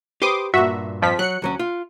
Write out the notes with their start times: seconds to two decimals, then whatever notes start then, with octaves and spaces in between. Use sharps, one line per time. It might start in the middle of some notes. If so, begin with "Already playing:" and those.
0.22 G4 B4 C5 C6 D6 D#6
0.54 G2 A#2 F#4 E5
1.02 F2 F3 B6
1.19 F#3 F#6 C#7
1.42 D2 F#3 C#4
1.59 F4